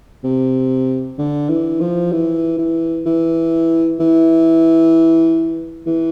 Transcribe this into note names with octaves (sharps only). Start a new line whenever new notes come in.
C3
D3
E3
F3
E3
E3
E3
E3
E3